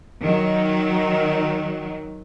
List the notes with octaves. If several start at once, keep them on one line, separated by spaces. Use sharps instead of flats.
D#3 F#3